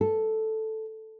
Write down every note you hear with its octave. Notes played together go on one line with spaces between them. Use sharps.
A4